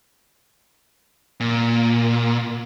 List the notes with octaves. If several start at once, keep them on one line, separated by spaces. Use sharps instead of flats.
A#2